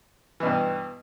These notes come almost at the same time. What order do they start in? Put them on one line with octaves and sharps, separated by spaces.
E3 B2 G2